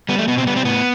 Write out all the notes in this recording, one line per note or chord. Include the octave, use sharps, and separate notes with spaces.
G3 B3
A3
B2 B3
C4
G3 B3
C4
A2 B3